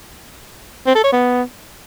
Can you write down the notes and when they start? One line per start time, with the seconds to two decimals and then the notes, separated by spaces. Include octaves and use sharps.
0.87 C4
0.95 A4
1.04 C#5
1.12 B3